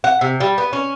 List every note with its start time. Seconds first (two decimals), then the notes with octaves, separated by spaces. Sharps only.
0.04 F#5
0.21 C3
0.40 G3
0.58 B3
0.73 C#4